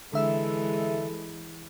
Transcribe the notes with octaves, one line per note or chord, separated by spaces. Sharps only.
D3 E3 G#3 A4 E5 E6